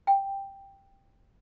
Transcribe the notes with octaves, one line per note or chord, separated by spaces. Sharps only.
G5